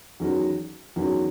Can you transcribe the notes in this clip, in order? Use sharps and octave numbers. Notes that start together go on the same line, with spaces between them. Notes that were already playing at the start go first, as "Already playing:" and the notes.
E2 D#3 F#3 C#4 F#4
E2 D#3 F#3 C#4 F#4